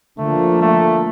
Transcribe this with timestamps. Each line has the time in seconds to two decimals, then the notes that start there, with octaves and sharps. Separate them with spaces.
0.18 D3 F3 A3 A#3
0.62 A3